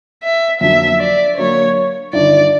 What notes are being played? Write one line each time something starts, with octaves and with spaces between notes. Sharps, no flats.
E5
F2 D3 F#3 A#3 E5
D5
D3 F#3 A#3 C#5
G1 G2 D#3 D5